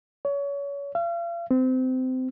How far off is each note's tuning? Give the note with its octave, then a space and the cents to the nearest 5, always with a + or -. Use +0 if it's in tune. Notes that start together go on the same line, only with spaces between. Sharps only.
C#5 +30
F5 -40
C4 -25